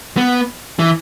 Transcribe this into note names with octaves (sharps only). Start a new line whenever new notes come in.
B3
E3